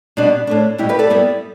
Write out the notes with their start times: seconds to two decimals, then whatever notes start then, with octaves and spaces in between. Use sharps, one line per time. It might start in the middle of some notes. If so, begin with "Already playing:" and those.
0.17 B2 G3 D4
0.47 A2 A3 D4
0.78 B2 G3 E4 G4
0.89 G4 B4
0.99 A4 D5
1.10 G2 G3 B3 E4